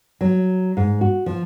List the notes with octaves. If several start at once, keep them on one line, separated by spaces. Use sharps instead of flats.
F#3
G#2
F#4
F3